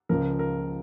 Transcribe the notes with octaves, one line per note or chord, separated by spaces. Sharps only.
C#2 C#3 F3 A#4
A#4